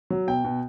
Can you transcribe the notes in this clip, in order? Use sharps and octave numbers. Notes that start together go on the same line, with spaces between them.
F#3
B2 G5
B2